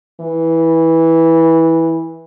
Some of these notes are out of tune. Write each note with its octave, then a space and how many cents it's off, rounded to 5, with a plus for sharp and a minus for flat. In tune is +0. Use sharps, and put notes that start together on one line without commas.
E3 -15